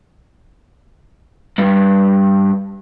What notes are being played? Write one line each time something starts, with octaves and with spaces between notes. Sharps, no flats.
G2